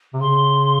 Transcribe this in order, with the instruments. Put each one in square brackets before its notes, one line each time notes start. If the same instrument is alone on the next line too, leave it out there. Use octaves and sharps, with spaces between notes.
[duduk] C3
[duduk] C#3 [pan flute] C6